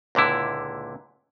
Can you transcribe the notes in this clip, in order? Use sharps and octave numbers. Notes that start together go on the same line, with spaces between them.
C#2 A#2 D3 E4